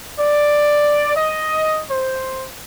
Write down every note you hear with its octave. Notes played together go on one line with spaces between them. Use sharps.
D5
D#5
C5